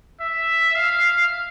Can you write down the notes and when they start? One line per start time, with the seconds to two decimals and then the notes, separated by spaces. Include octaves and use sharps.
0.21 E5
0.75 F5